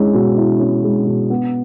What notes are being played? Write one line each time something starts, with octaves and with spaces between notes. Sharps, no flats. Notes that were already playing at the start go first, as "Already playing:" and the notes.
Already playing: G#3 C#4 E4
B2
E4
C#4
G#3
B2
B3